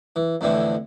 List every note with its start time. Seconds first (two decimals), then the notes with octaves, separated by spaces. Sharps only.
0.16 E3
0.41 F2 A2 D3 E3 C4